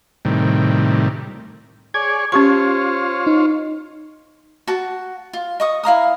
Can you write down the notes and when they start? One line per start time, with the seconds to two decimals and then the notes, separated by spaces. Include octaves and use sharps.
0.25 A2 C3 D#3 G3
1.94 G#4 C#5 D5 G#6
2.32 C#4 F4 G4 C5 C#5 C#6
3.27 D#4
4.67 F#4 A5
5.33 F4
5.60 D#5 C#6 D#6
5.84 E4 F5 A#5 D#6